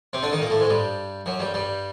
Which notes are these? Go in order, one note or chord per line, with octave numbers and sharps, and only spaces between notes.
C3 C4
D3 D4
D#3 D#4
A#2 A#3
A2 A3
G#2 G#3
G2 G3
F#2 F#3
G2 G3
G2 G3